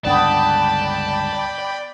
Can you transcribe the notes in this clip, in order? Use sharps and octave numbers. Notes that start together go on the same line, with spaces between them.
C#2 G2 D3 B3 D5 G5 A5 B5